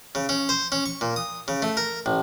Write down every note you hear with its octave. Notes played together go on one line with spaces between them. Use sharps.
C#3
C#4
C5
C#4
C#6
A#2
D#6
C#3
A3
A#4
A1